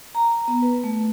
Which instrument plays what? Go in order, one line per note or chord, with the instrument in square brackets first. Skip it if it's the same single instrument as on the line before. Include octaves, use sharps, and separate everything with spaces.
[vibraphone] A#5
B3
B4
A3